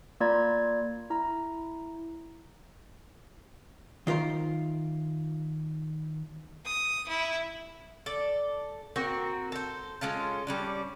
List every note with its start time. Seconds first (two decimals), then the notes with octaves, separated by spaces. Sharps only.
0.20 A#3 F4 D5 A#5 B5 G#6
1.10 E4 A#5
4.07 D#3 F4 A#4 C5
6.65 D#6
7.08 E4
8.06 A4 D5
8.96 A#3 C4 F#4 A#4
9.52 A4 C5
10.01 G#3 C#4 F4 A4
10.47 G3 C#4 D4